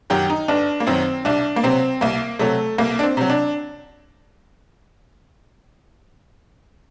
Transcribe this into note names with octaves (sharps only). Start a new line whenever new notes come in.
F#2 D#3 F#3 G4
D#4
G1 D4
A#3
F#2 D#3 F#3 C4
C2 D4
A#3
C3 F#3 C4
C2 A#3
C3 F#3 A3
C2 A#3
D4
C4
C3 F#3
D4